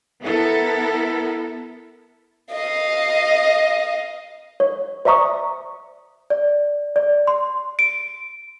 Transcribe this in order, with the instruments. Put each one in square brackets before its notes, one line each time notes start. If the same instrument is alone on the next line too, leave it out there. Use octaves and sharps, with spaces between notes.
[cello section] B3 E4 A4 A#4
[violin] D#5 F5
[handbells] C#5
C5 D5 E5 A#5 C#6 D#6
[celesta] D5
D5
C6
D7